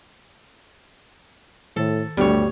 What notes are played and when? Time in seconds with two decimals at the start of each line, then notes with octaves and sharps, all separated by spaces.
1.76 A2 D#3 A4
2.17 D2 G2 G3 A3 B3 C#5